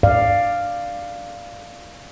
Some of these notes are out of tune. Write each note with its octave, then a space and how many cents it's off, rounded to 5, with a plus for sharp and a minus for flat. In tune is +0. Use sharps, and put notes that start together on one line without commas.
D5 +10 F5 +0